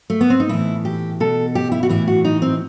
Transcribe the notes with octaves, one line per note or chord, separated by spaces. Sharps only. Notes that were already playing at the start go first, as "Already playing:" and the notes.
A3
B3
C4
D#4
A2 E3 E4
G4
B2 A4
G4
E4
F#4
A2 E3 E4
F#4
D#4
C4